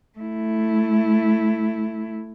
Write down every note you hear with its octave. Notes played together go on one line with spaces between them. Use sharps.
A3 E4